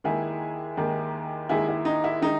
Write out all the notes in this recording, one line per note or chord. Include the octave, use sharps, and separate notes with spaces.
D#2 D#3 G#3 E4 G#4
D#2 D#3 G#3
D#2 D#3 G#3 E4 G#4
E4
D#4
E4
D#3 G#3 D#4